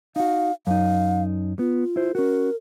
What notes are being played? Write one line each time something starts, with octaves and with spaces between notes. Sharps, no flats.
D#4 F#4 F5
F#2 D#4 F5
B3 F4
E4 C5
C#4 F#4 A#4